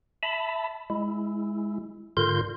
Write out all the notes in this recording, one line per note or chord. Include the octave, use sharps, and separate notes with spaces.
E5 A5 B5
G#3 E4
G#2 D3 F4 A#4 C6 G6